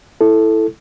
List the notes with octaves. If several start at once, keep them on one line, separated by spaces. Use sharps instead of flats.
E4 A4